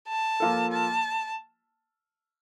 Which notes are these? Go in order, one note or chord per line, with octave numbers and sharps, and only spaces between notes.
A5
F3 A#3 F4 A4
A5